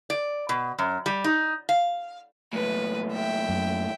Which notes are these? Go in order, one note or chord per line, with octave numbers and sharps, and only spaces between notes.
D5
B2
F#2
G3
D#4
F5
B1 A2 B4
E5 G5
F#2